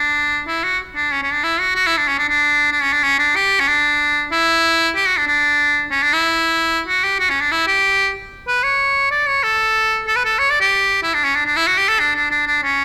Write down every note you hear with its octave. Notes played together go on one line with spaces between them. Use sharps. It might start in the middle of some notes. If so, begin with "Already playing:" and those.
Already playing: D4
E4
F#4
D4
C#4
C#4
D4
E4
F#4
F#4
E4
D4
C#4
D4
D4
D4
C#4
D4
C#4
D4
G4
C#4
D4
E4
G4
F#4
D4
D4
C#4
D4
E4
F#4
G4
F#4
C#4
D4
E4
G4
B4
C#5
D5
C#5
A4
A4
B4
A4
C#5
D5
G4
E4
D4
C#4
D4
D4
E4
F#4
G4
A4
D4
D4
D4
D4
C#4